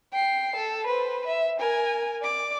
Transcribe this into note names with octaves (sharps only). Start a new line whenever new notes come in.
G5 C7
A4
B4 C5
E5
A#4 G#5
D5 D6